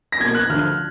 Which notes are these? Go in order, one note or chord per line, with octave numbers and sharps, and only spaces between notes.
A#6
B2 A#3 G#6
F#6
D2 D3 F3 F6